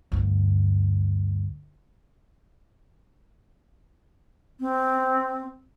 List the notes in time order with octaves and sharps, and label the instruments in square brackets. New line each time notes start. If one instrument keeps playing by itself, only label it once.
[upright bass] D2 G2
[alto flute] C4